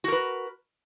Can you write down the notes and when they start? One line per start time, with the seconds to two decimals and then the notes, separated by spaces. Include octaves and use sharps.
0.04 F#4
0.08 A#4
0.12 B4